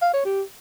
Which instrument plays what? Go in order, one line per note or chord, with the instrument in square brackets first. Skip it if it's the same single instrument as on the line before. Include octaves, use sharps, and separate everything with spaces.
[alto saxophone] F5
C#5
G4